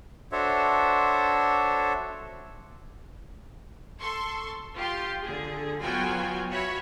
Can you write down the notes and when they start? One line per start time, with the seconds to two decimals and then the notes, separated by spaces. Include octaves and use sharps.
0.32 D4 F#4 A4 C5 C#5 E5
4.00 A4 C6 C#6
4.76 F4 G4 C6
5.24 D3 G#4
5.82 F#3 B3 F4 F#4 G5 G#5
6.51 F#4 C#5 E5 B5